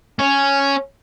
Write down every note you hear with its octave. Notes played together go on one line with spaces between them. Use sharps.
C#4